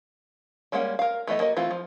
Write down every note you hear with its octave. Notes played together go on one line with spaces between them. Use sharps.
G3 G#3 A#3 C#4 F#5
A#4 F5
E3 A3 B3 D#5
A#3 F#4 D#5
E3 A3 C4 F4
F3